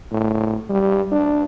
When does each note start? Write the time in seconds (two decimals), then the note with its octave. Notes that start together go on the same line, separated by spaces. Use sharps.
0.12 A2
0.70 G3
1.12 D4